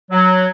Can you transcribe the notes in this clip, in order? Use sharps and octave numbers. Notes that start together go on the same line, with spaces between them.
F#3